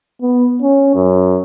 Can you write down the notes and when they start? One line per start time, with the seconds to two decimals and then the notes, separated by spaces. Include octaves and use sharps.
0.22 B3
0.62 C#4
0.95 F#2